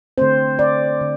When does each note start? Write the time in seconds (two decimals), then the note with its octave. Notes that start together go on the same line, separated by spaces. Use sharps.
0.18 D3 A3 C4 C5
0.59 D5
1.01 D3